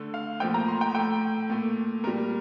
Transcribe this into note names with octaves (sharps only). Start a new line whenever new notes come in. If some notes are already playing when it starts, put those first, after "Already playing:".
Already playing: D3 A3
F5
A#2 F3 A3 G5
A#5
C6
G5
A2 A3 G5
A#2 A3
A#2 G3 A#4